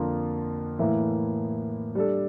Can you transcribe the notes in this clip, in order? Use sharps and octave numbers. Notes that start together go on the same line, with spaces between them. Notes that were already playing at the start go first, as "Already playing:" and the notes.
Already playing: F2 D3 F3 A#3 F4
A2 E3 A#3 E4
G3 D4 A4